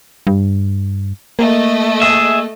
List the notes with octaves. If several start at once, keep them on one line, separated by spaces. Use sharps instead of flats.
G2
A3 A#3 D#5
G#4 E5